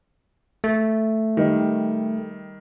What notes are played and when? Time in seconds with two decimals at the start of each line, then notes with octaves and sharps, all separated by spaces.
0.64 A3
1.37 D#3 G3